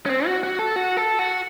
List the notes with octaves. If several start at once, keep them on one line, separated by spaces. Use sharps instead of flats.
C#4
C4
F#4
F#4
A4
F#4
A4
F#4